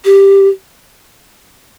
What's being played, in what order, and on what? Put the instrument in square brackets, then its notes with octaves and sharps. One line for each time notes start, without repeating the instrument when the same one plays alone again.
[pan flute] G4